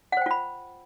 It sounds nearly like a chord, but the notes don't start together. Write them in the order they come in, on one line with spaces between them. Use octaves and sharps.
F#5 C5 G5 F4 B5